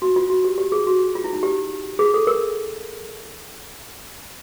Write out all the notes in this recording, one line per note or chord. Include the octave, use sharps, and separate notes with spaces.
F#4
F4
F#4
G4
G4
G#4
F#4
F4
E4
D#4
G4
G#4
A4
A#4